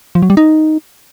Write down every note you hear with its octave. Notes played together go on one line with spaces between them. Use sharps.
F3
F#3
G3
D#4